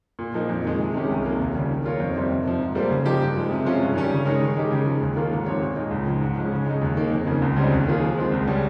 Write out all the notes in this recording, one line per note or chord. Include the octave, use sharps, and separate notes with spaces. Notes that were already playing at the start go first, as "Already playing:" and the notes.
A#2
F3 A#3 D#4
F2
D#3 G#3
C3
D#3 G#3 C#4 G4
C2
C3 F3 A#3
D#2
C#3 G3
D#3
A#3 F4 A#4 C#5
F2
C3 D#3 G3 C4
F2
C3 F3
G#2
G3 A#3 F4 C5
C#3
F3 A#3 D#4 G4
G2
F3 G#3
C3
F3 G#3 C#4 F4
G2
D#3 G3 C#4
C#3
G#3 D#4 A#4 C#5
D#3
G#3 D#4 G4
C#3
F3 G#3
D#2
D#3 A#3 F4
G#2
F3 C4 G4 C#5
A#2
G#3 D#4
C#2
C#3 F3
G#2
F3 G#3 C#4
C#3
G#3 D#4
D#2
D#3 A#3 D#4
F2
C#3 F3 A#3
C#2
C#3 G3 C4 D#4
D#2
D#3 A#3 F4 G#4
F3
G#3 C4 F4
C#2
C#3 G3 C#4